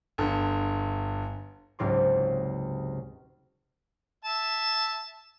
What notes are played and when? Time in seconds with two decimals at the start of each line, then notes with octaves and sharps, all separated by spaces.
0.18 G1 D3
1.79 F#1 C#2 G#2 C3 C6
4.25 E5 A5